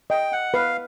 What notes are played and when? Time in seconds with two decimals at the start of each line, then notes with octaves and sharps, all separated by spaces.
0.10 D#5 G5
0.32 F#5
0.54 B4 F5